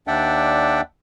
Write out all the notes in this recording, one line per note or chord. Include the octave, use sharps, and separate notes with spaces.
D#2 D4 D5 E5 F#5 G5